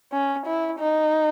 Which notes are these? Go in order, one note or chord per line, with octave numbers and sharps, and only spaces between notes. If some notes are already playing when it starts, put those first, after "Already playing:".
C#4
E4
D#4